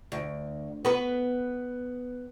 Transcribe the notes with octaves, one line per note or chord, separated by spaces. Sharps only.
D2
B3 B4